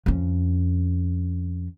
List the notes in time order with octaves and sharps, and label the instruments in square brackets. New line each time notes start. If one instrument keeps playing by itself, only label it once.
[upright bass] F2 C#4